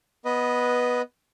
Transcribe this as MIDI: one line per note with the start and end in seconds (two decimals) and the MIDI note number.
0.25 1.02 59
0.25 1.02 71
0.25 1.02 75